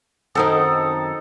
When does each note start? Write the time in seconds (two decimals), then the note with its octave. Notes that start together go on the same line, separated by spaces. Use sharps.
0.35 F#2 D#3 C4 D#4 A4 D#6